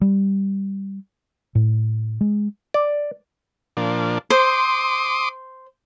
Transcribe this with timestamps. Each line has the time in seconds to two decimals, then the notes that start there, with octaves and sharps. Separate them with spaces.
0.01 G3
1.55 A2
2.21 G#3
2.74 D5
3.77 A#2 F3 D4
4.30 C5 C6 D6 D#6